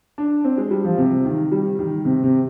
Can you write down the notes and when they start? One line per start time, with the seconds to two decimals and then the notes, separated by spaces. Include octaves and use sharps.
0.18 D4
0.44 C4
0.58 G#3
0.71 G3
0.85 F3
0.98 C3
1.25 D#3
1.52 G3
1.79 D#3
2.05 C3
2.23 C3